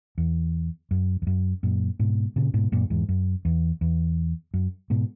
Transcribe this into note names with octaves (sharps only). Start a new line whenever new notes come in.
E2
F#2
E2
F#2
F#2 A#2
G#2 B2
A#2 C#3
G#2 B2
F#2 A#2
E2 G#2
F#2
E2
E2
F#2
G#2 B2